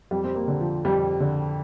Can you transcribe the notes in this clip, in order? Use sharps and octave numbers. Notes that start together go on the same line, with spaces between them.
F2 G3
C4
A#3
D3
F3
F2 G3
D3